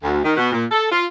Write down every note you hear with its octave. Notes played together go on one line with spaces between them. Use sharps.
D2
D#3
B2
A#2
A4
F4